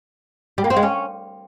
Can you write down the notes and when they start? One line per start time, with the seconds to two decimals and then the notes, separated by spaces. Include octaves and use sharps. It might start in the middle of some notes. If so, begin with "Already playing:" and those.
0.58 G3
0.64 A#3
0.70 C4
0.76 G#3
0.83 C#4